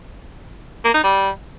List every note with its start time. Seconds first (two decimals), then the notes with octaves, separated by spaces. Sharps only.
0.84 A#3
0.94 D#4
1.03 G3